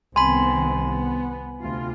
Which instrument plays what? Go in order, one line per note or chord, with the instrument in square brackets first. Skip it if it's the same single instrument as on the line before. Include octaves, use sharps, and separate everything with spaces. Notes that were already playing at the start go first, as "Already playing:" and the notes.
[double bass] C2 [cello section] D#3 B3 C4 [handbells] G#5 B5 [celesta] C6
[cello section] B3
D2 C3 F4